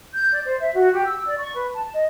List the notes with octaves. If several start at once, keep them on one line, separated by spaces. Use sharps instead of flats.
G6
D5
C5
E5
F#4
G4
E6
D5
C#6
B4
A5
D#5